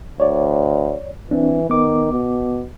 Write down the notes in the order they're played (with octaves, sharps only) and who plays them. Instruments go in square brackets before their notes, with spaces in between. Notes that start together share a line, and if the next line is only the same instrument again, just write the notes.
[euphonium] D2 [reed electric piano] C#5 D5
[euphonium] E3 [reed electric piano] C4 D4
[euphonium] D#3 [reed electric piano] B3 D6
[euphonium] B2